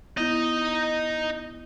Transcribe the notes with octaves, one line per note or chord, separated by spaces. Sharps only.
B3 D#4 E4 D#5